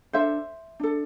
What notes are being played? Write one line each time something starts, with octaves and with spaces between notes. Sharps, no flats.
D4 A4 C5 E5
D4 A4